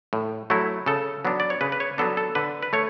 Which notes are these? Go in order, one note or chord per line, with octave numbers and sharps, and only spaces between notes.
A2
F#3 A3 E4
C#3 A4
F#3 B3 D4
D5
C#5
C#3 B4
B4
C#5
F#3 B3 D4 A4
A4
D3 B4
B4
A3 C#5